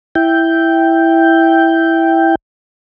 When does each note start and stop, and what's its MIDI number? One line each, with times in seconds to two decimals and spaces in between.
0.15 2.35 64
0.15 2.35 79